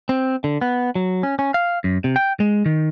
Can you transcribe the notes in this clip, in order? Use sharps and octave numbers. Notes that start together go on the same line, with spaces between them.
C4
D3
B3
F#3
C#4
C#4
F5
F#2
C3
G5
G#3
D#3